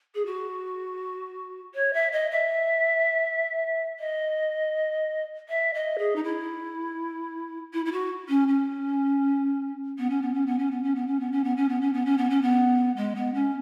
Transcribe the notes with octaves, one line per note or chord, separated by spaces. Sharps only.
G#4
F#4
C#5
E5
D#5
E5
D#5
E5
D#5
G#4
D#4
E4
E4
E4
F#4
C#4
C#4
B3
C#4
B3
C#4
B3
C#4
B3
C#4
B3
C#4
B3
C#4
B3
C#4
B3
C#4
B3
C#4
B3
C#4
B3
G#3
B3
C#4